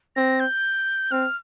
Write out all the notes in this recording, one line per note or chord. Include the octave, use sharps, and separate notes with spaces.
C4 A#6
G6
C4 F6